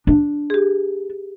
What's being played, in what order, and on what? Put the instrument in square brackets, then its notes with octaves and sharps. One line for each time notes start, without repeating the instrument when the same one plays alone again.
[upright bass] D4
[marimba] G4 G#4